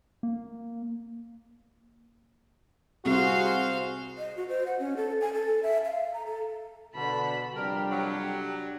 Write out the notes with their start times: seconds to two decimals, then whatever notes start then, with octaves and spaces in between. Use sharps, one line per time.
0.23 A#3
3.05 C2 F#4 G#4 C5 F5
4.18 D#5
4.37 F#4
4.49 C5
4.67 F#5
4.79 C#4
4.97 A4
5.21 G#5
5.33 A4
5.63 E5
5.86 F5
6.13 A#5
6.26 A4
6.95 B2 D3 A5 B5
7.55 F2 C3 G3 D4 G4 A#4
7.91 F#3